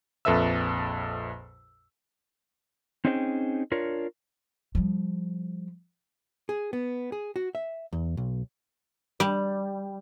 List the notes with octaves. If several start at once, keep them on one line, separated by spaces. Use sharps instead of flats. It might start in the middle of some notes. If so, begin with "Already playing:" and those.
A#1 F2 A4 B4 E5 E6
C4 C#4 D#4 G#4 C5 G5
D4 F4 A#4 C#5
F3 G3
G#4
B3
G#4
F#4
E5
E2
B1
G3